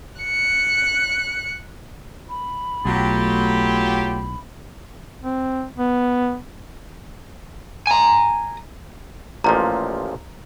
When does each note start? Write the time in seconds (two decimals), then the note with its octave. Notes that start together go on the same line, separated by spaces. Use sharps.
0.21 F#6 C#7
2.29 B5
2.85 B1 F#3 A3 F4 G4
5.22 C4
5.78 B3
7.87 G#5 A#5
9.44 A1 A#2 F3 A#5